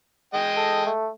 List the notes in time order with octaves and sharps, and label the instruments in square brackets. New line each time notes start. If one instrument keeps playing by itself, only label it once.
[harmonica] G#3 D#5 G5
[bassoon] A4
A3